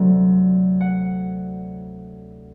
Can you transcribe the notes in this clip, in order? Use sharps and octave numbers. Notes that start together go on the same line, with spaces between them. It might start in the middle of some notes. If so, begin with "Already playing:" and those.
Already playing: D2 C3 F#3
F#5